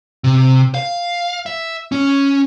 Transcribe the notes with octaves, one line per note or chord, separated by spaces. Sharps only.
C3
F5
E5
C#4